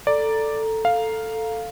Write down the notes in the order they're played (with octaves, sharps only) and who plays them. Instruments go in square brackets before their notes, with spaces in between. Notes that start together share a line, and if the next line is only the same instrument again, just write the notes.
[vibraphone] A4 A#5 [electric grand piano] D5
[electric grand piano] F5